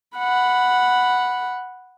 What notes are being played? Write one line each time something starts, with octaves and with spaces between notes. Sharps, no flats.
F#5 B5